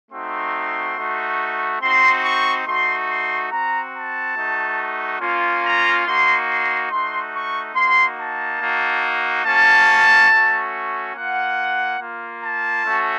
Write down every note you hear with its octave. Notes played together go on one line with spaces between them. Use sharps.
A3 C4 D#4 F#4 C6
A3 D#4 F#4
C4 D#4 F#4 C6
C#6
A3 D#4 F#4 C6
C6
C4 F#4 A#5
A5
A3 D#4 F#4
A#3 C#4 F4
A#5
A#3 D#4 F#4 C6
C6
A3 D#4 F#4 C6
C#6
A#3 D#4 F#4 C6
A5
A#3 D#4 F#4
A#3 C#4 F#4 A5
A3 C#4 F#4
A#3 F4 F#5
A#3 F4
A5
A3 C#4 F#4